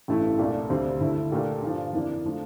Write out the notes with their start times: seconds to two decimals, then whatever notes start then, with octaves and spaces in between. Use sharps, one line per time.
0.08 A1 G2 E3 A3 E4
0.39 C2 A#2 A3 D4
0.70 D2 C3 G3 C4
1.01 D2 D3 A3 E4
1.32 A#2 A3 D4 G4 A#4
1.62 G2 D3 F3
1.93 F2 E3 A#3 D4
2.25 D3 F3 A3